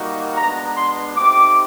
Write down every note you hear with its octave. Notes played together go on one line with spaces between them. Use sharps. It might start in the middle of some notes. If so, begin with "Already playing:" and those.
Already playing: G3 A#3 D#4 F#4
G#3 B3 D4 F#4 A#5
C6
A3 C4 D#4 G4 D6